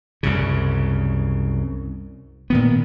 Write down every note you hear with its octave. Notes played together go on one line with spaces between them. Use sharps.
C2 F#2 C#3
A#2 D#3 B3